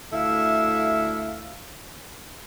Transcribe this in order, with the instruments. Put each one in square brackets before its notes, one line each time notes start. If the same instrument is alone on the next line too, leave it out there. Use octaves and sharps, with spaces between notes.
[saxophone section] D2 E4 A4 E5 F5